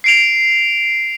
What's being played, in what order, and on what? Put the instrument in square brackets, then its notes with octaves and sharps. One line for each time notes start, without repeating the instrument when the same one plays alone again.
[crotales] C7 D7 F7